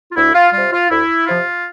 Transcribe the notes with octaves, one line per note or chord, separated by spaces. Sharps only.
F4
D2 E4
F4
C3 G3 F4
F4
D2 E4
C3 F3 F4